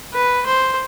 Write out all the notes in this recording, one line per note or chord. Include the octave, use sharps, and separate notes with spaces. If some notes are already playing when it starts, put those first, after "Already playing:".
B4
C5